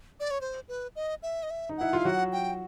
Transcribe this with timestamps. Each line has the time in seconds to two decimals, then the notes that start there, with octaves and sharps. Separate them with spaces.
0.20 D5
0.31 C#5
0.41 C5
0.68 B4
0.96 D#5
1.22 E5
1.43 D#5
1.50 E5
1.69 D#4
1.78 E4 F#5
1.93 F4 F5
2.05 F#3 F#4 F#5
2.32 G5